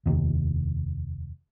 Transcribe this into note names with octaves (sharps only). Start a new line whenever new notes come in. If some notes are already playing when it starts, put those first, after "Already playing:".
F1 D#2